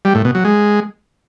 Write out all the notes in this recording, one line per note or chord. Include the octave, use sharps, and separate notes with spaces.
G3
A2
B2
F#3
G#3